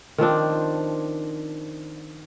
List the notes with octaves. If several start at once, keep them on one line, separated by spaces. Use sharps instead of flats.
D#3 F3 C4 D4